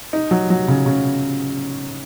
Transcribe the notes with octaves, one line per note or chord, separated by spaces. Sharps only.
D#4
F#3
F#3
C#3
C#3